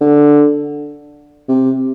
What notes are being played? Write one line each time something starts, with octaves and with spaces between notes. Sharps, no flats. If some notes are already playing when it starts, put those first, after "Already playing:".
D3
C3